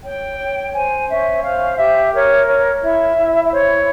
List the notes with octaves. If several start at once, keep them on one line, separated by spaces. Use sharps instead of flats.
C#5 G5
C#5
C5 G#5
C#4 E5
C5 F5
G4 E5
A#4 C#5
C#5
E4 E5
E4
E5
C5 C#5